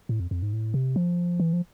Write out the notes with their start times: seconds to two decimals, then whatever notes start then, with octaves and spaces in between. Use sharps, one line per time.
0.09 A2
0.20 F2
0.31 F2
0.42 G#2
0.53 A2
0.74 C3
0.96 F3
1.40 E3
1.53 F3